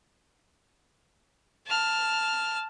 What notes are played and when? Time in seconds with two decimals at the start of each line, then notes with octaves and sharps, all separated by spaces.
1.67 A5 F6